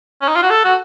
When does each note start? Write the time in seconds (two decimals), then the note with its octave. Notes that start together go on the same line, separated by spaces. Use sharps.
0.22 C#4
0.28 D#4
0.36 F4
0.43 F#4
0.50 A4
0.65 F#4